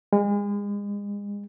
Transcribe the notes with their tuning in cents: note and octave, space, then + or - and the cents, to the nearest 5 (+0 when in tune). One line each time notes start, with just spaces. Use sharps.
G#3 -35